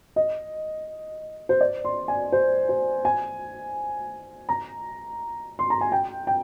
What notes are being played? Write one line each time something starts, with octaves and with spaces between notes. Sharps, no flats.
D#5
C5
D5
C6
G#5
C5
C5
G#5
A#5
C6
A#5
G#5
G5
G5